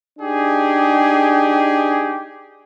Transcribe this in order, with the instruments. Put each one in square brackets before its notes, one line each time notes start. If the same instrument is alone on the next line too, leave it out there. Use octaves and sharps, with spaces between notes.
[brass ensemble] D4 D#4 G4 G#4